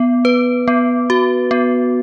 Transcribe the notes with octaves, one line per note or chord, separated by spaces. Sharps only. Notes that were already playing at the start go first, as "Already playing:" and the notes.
Already playing: B3
B4
B3
F#4
B3